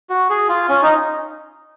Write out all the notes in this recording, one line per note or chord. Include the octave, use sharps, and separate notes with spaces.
F#4
G#4
F4
C#4
D#4